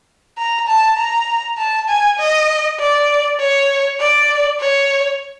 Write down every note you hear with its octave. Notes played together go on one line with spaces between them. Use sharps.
A#5
A5
A#5
A5
G#5
D#5
D5
C#5
D5
C#5